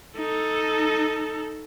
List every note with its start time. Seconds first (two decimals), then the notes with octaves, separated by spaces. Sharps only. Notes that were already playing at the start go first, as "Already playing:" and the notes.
0.18 D#4 A4